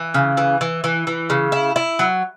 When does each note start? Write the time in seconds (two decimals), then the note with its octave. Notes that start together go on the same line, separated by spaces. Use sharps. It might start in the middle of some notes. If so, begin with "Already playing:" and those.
Already playing: E3
0.14 C#3
0.37 E3
0.61 E3
0.84 E3
1.07 E3
1.30 C#3
1.52 E4
1.76 E4
1.99 F#3